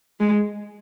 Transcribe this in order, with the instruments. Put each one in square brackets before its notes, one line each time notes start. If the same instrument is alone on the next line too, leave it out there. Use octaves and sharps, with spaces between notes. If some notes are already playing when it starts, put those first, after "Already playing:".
[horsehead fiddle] G#3